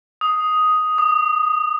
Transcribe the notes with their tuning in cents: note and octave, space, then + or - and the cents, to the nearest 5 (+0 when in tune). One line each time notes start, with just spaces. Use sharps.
D#6 +5
D#6 -35